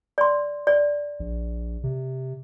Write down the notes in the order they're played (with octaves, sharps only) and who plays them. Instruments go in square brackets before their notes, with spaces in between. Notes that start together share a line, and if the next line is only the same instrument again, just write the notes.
[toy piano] D5 C6
D5
[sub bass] A#1
C3